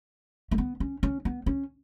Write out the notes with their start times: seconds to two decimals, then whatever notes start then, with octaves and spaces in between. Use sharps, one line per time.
0.51 A3
0.58 B3
0.80 C#4
1.03 C#4
1.25 B3
1.46 C#4